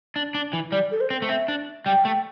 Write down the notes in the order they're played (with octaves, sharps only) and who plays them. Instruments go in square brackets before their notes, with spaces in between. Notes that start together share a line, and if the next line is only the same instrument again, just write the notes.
[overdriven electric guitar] D4
D4
E3
[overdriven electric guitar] G3 [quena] D5
[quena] A4
C5
[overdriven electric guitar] C4
A3
[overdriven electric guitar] C4 [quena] E5
[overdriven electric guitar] D4
[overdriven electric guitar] G3 [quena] G5
[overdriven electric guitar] A3